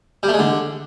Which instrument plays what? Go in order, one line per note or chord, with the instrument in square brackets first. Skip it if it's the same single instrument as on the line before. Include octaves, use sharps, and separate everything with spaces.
[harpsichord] G3
A3
G#3
D3